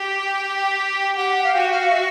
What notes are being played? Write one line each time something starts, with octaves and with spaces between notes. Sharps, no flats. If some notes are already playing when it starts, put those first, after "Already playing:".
Already playing: G4 G5
G4 F#5
F5
G5
F#4 F#5
F5
E5